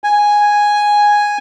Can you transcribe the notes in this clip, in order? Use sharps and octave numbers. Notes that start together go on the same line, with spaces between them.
G#5